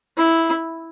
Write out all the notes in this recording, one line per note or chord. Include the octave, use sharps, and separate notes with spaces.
E4